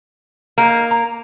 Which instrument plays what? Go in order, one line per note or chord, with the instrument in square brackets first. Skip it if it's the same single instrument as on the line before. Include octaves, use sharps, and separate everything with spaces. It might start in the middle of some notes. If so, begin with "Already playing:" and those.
[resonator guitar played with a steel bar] A#3 [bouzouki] D#4
[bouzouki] A#5